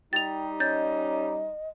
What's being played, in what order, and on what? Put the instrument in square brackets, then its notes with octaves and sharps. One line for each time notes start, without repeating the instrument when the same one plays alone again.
[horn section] G3 D#4 [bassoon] G4 [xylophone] A6 F7
[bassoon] C#4 [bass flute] D#5 [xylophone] G6 A6